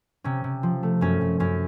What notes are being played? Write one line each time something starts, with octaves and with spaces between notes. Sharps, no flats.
C3 C#4
C3
F3
A3
F#2 C#4
F#2
F#2 C#4